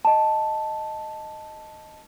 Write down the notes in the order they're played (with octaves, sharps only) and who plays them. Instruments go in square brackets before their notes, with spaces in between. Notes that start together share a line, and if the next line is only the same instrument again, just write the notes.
[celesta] D#5 A5